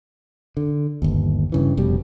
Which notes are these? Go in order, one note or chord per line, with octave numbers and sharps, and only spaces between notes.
D3
G1 D#2
G2 C#3 E3
F1 B2 G3